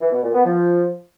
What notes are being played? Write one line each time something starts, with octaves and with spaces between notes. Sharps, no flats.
E3
B2
A#2
B3
F3